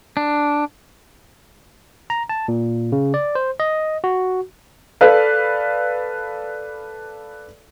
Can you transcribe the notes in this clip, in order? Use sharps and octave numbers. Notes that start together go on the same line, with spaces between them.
D4
A#5
A5
A#2
C#3
D5
C5
D#5
F#4
A4 B4 D5 F5